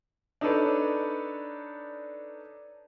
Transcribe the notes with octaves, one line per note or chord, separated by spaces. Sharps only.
D4 D#4 A4 B4 C#5 D5